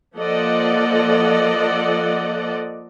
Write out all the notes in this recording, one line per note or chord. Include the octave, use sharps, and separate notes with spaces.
F3 A#3 A4 D5 D#5 F#5